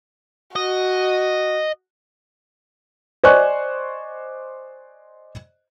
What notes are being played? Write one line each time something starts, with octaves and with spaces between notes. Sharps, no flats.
F#4 D#5
C5 D5 D#5 G#5 C#6 F#6